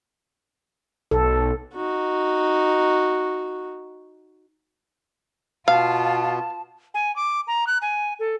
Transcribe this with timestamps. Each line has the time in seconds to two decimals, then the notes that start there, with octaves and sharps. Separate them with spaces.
1.11 B1 A4
1.73 D#4 F#4
5.68 B2 B3 F4 F5 A5
6.94 G#5
7.16 D6
7.47 A#5
7.67 F#6
7.82 G#5
8.19 A4